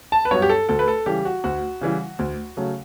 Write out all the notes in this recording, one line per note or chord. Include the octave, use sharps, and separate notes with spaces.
A5
B4
G2 F#3 B3 C#5
G4
A4
D2 A4
B4
A4
C#3 E3 G3 G4
F#4
D2 F#4
C#3 E3 G3
D2
C#3 F#3 A3